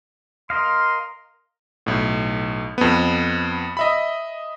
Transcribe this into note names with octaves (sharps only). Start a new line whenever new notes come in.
A#4 D#5 F5 C6
B1 A2
F2 B3
D#5 E5 B5